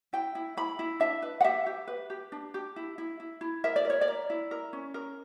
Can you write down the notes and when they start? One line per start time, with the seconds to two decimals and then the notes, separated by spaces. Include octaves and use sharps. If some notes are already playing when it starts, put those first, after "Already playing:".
0.13 E4 G5
0.35 E4
0.57 E4 B5
0.79 E4
1.00 D4 E5
1.22 B4
1.41 F#5
1.44 G4 E5
1.66 G4
1.87 B4
2.10 G4
2.32 D4
2.54 G4
2.76 E4
2.98 E4
3.20 E4
3.41 E4
3.64 A#4 E5
3.76 D5
3.85 A#4 C#5
4.01 D5
4.08 A#4
4.30 E4
4.51 A#4
4.73 C#4
4.94 A#4